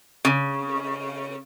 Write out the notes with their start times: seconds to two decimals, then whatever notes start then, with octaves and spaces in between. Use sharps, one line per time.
0.25 C#3